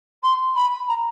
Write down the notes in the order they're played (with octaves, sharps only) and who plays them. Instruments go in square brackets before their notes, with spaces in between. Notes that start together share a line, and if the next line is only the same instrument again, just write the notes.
[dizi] C6
B5
A#5